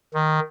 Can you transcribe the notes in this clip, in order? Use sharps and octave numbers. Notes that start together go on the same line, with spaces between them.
D#3